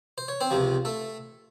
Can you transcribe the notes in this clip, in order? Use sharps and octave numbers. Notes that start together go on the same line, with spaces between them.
C5
C#5
C4 C5
C#2 C3 F3
A3 A4